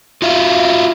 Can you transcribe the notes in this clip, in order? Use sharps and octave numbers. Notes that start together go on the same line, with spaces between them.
F4 F#4 E5 F5